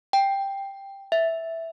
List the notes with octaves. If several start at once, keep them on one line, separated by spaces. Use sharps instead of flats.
G5
E5